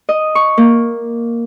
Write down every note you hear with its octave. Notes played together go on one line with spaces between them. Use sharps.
D#5
C#6
A#3